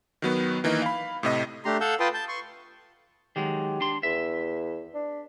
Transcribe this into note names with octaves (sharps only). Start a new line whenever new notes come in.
D#3 F#3 B3
D#3 E3 A#3 D#4
F5 B5
A2 C3 D#5
A3 D4 G4 A#5 C6
A4 F5 F#5 E6 G6
F4 B4 G5 A5 C6 D#6
A5 G6
C6 C#6
D#3 F#3 G#3 G4
D4 C6
E2 E5
D4